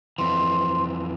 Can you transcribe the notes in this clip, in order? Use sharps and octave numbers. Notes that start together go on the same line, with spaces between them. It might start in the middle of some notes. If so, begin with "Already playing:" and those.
F2 E3 C6